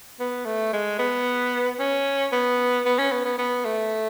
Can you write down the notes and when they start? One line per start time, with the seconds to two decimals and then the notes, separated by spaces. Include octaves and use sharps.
0.20 B3
0.45 A3
0.73 G#3
0.99 B3
1.79 C#4
2.32 B3
2.85 B3
2.99 C#4
3.12 B3
3.25 B3
3.38 B3
3.65 A3